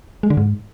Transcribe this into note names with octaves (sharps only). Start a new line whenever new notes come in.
G#3
D3
G#2